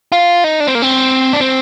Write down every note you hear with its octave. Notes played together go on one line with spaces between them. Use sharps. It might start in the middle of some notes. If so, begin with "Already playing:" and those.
F4
D#4
D4
C4
A#3
C4
D4
C4